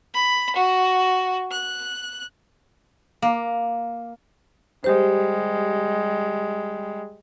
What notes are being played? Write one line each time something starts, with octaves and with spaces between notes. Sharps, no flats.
B5
F#4
F#6
A#3
G3 G#3 G4 C5